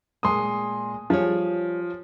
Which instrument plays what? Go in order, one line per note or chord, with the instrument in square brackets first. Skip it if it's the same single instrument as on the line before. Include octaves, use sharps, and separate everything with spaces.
[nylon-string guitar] A#2 G#3 A5 [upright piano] C6 D#6
[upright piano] F3 [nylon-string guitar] G3 G#4 C#5